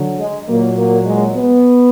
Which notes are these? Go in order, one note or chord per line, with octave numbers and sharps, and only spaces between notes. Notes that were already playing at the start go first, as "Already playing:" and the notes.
Already playing: D3 F#3
G#3
A#2 F#3 A#3
A#3
G#3
B3